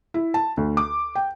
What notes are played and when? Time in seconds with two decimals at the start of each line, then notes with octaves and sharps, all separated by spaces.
0.14 E4
0.34 A5
0.57 D2
0.77 D6
1.15 G5